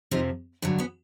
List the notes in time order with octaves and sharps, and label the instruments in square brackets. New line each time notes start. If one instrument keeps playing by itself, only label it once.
[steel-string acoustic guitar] F2 C3 F3 D#4 F4
G2 D3 F#3
B3 C#4